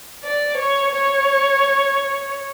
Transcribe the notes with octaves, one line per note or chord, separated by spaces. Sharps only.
D5
C#5
C#5